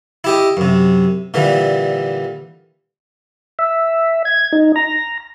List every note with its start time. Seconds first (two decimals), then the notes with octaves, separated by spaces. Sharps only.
0.24 E4 G4 D#5
0.57 F#2 C3
1.34 A#2 D3 E3 G3
3.59 E5
4.25 G#6
4.52 D#4
4.76 A#5